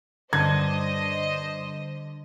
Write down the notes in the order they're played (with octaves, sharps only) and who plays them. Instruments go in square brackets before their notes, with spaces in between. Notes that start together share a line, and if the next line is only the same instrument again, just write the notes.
[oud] G2 [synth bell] D3 [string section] C5 D#5 [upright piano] G#6